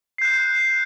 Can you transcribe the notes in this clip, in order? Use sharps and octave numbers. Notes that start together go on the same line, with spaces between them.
F#6 G6 C7